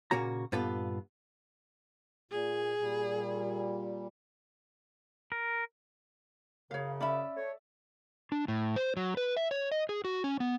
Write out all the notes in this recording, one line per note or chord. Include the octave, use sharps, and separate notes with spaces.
A#2 C#3 A#3 F#4 A#5
G2 A#2 B3 F4 A4 B4
A#2 G#4
A#2 G3
A#4
F#2 C#3 C#5 F5
C#4 D5 E5 B5
A3 C#5
D4
A2
C5
F#3
B4
E5
C#5
D#5
G#4
F#4
C#4
B3